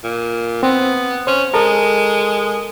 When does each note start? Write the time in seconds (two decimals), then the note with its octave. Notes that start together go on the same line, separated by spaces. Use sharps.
0.04 A#2
0.63 B3 C4
1.27 C#4 C5
1.54 G#3 A4 A#4